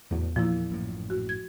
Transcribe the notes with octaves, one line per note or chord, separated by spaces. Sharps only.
E2 A2 F#3
E2 A#2 F3 E4
A1 F#2 A2
F#4
G#6